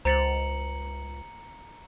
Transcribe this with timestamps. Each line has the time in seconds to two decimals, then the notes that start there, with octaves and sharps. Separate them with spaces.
0.05 C#2 C5 A#5 A6 C#7 F#7